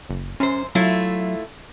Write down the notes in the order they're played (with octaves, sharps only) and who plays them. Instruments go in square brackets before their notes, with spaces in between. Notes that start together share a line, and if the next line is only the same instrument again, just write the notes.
[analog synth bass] F#1
[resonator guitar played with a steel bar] F#2 C5 [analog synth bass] C#4
[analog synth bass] F#3 [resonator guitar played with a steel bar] A3 E4 F4